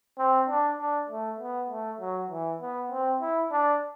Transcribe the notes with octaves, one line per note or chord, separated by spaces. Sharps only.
C4
D4
D4
A3
B3
A3
F#3
E3
B3
C4
E4
D4